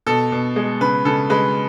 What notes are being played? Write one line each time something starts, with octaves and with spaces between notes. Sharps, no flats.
B2 A4
B2
G#3
C#3 B4
C#3 A4
G#3 B4